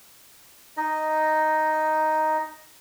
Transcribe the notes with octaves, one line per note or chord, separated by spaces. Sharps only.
D#4 D#5